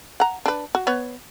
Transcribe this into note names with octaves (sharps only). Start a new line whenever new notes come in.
F#5 A#5
D4 B4
F#4
B3 B4 C#5